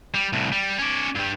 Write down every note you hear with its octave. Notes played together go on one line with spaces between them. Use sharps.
G3
C2 A2
G3
C#4 D5
G2 G3